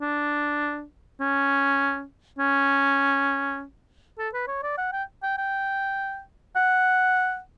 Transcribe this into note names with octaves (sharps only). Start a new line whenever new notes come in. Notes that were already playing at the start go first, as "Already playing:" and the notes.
D4
C#4
C#4
A4
B4
C#5
D5
F#5
G5
G5
G5
F#5